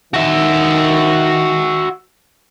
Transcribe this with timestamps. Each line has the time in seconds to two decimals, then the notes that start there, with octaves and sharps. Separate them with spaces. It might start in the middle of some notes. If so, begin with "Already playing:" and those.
0.14 D#3 F#4 E5